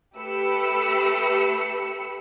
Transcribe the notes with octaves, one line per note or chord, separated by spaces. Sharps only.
A3 G4 B4 B5 E6 C#7